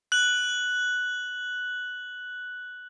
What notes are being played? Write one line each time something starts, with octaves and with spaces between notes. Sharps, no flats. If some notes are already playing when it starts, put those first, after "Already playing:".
F#6 F#7